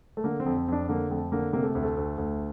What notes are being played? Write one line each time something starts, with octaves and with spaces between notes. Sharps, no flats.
A3
D3 A#3
C4
F2
C4
F2 D4
D3 A#3
F2 A3
D3 A#3
C3 A#3
A3
D2
A3
D2
D2